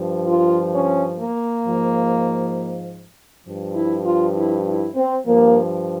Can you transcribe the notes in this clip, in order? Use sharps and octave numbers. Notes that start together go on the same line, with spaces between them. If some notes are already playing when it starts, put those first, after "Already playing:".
Already playing: G2 F3
F4
C#4
A#3
G#2 F3
G2 F3
E4
F4
E4
E4
C4
G2 F3 A#3